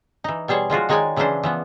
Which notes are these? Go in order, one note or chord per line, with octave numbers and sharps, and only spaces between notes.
E3 D#4
B2 G3 G#4 C5 C#5
F3 G#3 F4 F#4
D#3 G#3 D#4 C#5 D5 G#5
C#3 E3 F#3 C#4 D4 C5
E3 F3 B3